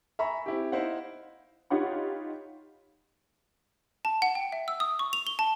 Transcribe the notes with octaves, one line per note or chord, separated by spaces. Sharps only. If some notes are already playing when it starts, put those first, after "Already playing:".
E5 G#5 A#5 B5 C#6
C4 E4 G4
D#4 E4 C5 F5 F#5
D#4 F4 G4 C#5 F#5 B5
A5
F#5
G5
E5
E6
D#6
C#6
F7
G7
A5